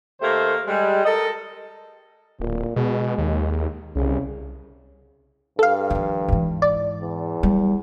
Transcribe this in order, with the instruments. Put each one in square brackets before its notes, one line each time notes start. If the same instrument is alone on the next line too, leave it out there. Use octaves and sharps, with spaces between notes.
[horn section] D#3 A3 A#3 G4 C5
G3 G#3
A4 A#4 D#5
[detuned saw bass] D1 [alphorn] A#2
[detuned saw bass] B2 [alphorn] G#3
[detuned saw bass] D#2
[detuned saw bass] C2 [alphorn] C#3
[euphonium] G2 [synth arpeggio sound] A4 F5
[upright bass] D#3 F3
G#2 E3
[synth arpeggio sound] D5
[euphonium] E2
[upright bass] F#3 G3